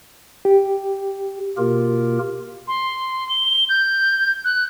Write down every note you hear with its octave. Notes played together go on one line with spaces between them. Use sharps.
G4
B2 A#3 F4 G4 A#4
C6
G7
G6
F#6